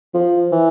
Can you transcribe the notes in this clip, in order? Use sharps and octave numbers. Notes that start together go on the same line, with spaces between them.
F3
E3